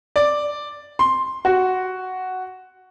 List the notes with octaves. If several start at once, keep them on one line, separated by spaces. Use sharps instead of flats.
D5
C6
F#4